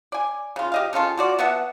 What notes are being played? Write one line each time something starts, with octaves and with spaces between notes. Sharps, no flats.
D5 G#5
C#3 F4
G4 D#5 F5
C#3 C#4 F4 A4
F4 F#4 D5
B3 E5 F#5 A5